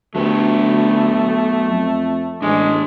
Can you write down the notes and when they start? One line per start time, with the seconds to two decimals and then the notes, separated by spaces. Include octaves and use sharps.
0.15 D2 F#3 A3 B3 G4
1.69 F2
2.42 A1 G#3 D4 G#5